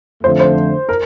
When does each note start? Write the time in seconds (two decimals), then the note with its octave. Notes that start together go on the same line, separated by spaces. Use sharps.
0.23 F2 D3 F3 A3 C5
0.40 C5
0.89 A#4